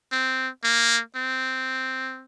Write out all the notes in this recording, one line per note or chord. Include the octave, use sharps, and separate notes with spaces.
C4
A#3
C4